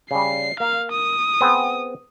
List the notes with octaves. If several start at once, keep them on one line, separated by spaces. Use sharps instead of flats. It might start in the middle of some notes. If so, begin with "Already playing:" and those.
C#3 G3 C7
A#3 F5
D#6
B3 C4 G#4